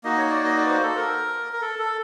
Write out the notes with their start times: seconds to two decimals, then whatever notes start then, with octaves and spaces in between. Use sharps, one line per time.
0.04 A#3 D#4 F#4 D#5
0.18 C#5
0.30 D5
0.44 D#5
0.57 D5
0.65 B4
0.70 C5
0.83 A4
0.97 A#4
1.53 A#4
1.62 A4
1.79 A4